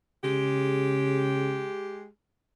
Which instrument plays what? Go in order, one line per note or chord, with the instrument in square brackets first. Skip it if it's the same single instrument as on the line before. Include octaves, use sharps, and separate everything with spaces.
[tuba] C#3 [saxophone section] G#3 G4